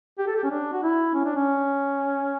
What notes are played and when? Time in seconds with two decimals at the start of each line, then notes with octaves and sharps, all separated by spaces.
0.19 G4
0.27 A4
0.36 G4
0.44 C#4
0.51 D4
0.73 F#4
0.83 E4
1.14 C#4
1.25 D4
1.36 C#4